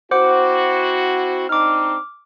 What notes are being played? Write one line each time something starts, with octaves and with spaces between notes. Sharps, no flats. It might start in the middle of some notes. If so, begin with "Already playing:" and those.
C4 E4 F#4 C5 F#5 D6
C4 D4 D#4 D6 F6